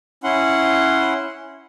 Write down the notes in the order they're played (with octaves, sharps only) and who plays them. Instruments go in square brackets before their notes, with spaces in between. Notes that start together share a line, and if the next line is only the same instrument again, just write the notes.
[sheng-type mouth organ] C#4 E4 F#5 C6